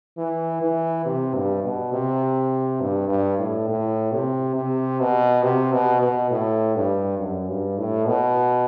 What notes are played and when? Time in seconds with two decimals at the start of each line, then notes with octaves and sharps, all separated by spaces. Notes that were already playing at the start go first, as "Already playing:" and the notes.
0.17 E3
0.61 E3
1.05 C3
1.35 G2
1.64 B2
1.93 C3
2.81 G2
3.09 G2
3.39 A2
3.69 A2
4.12 C3
4.55 C3
5.00 B2
5.43 C3
5.72 B2
6.02 B2
6.31 A2
6.75 G2
7.18 F#2
7.48 G2
7.78 A2
8.07 B2